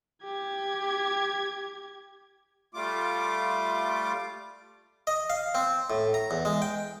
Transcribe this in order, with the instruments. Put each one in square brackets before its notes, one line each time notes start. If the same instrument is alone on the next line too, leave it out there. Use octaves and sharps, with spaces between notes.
[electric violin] G4 G#6
[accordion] G3 A3 F4 D6
[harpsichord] D#5
F5
C4
A2
A#5
E2
G#3
G5